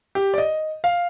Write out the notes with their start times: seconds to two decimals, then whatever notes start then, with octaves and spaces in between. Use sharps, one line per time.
0.15 G4
0.34 D5
0.38 D#5
0.84 F5